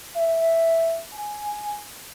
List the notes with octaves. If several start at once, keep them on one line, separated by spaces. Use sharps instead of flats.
E5
G#5